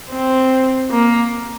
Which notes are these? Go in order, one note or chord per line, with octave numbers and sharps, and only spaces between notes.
C4
A#3